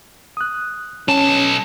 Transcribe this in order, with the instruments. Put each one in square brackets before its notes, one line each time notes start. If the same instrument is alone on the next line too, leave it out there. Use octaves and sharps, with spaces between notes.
[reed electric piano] D#6 F#6
[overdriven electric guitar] B1 A5 [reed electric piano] C#4